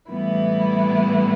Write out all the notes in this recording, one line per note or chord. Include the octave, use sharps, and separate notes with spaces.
A2 E3 G3 B3 E4